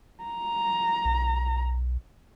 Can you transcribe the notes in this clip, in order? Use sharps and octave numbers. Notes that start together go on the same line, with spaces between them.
A#5
B1